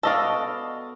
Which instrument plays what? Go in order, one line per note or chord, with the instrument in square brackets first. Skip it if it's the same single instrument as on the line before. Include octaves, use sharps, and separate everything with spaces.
[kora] B3 F#4 D5 [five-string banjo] A4 D#5 F5